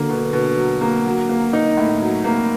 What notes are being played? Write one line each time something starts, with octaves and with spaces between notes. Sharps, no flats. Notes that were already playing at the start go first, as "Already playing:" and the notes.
Already playing: D3 F#3 A#3
B2
B2
F#3
A#3
F#3
A#3
D#4
A2
F#3
A#3